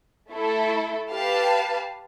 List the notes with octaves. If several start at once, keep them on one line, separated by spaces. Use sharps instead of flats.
A3 E4 A4
G4 B4 F5 A5